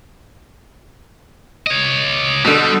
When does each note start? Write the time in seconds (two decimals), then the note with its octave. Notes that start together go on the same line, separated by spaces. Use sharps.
1.67 C#5 D#5
2.45 B2 D3 G3